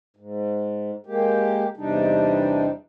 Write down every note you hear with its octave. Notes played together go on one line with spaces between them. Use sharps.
G#2
G#3 A#3 G4
E2 C3 G3 D4 D#4